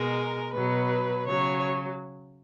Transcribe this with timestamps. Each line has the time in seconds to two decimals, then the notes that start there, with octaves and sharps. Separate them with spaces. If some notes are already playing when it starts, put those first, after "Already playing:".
Already playing: B2 G#3 A#4
0.54 B2 F#3 B4
1.27 C#3 F#3 C#5